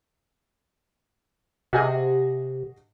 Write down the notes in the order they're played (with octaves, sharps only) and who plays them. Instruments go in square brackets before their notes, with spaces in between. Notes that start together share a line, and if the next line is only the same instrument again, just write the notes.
[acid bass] C3 [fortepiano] F#4 G#4 D#5